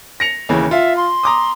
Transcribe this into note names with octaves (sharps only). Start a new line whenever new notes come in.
A#6 C#7 F7
D#2 C#3 E3
F4 E5
C6
A#5 D6 D#6